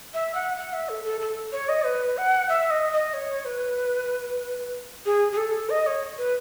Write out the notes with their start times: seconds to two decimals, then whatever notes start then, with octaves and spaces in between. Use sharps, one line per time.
0.14 E5
0.35 F#5
0.57 F#5
0.73 E5
0.89 A4
1.05 A4
1.21 A4
1.52 C#5
1.69 D#5
1.85 B4
2.18 F#5
2.49 E5
2.70 D#5
2.92 D#5
3.14 C#5
3.45 B4
5.06 G#4
5.32 G#4
5.37 A4
5.70 D#5
5.87 C#5
6.18 B4